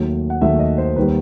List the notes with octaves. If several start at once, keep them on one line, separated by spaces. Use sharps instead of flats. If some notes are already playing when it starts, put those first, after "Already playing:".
Already playing: D#2 D#3 F#3 A3
F#5
D#2 D#3 F#3 A3 E5
D#5
C5
D#2 D#3 G3 B4